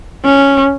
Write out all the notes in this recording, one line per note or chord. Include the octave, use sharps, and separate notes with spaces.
C#4